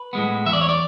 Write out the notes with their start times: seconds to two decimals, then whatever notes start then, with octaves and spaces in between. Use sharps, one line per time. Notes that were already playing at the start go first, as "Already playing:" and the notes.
Already playing: B4
0.13 A2 G#3 B3
0.46 E2 E5
0.53 D5
0.61 C#5
0.69 D5